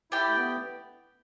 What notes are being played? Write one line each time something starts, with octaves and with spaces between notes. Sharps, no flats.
E4 G4 D5 G5
A3
B3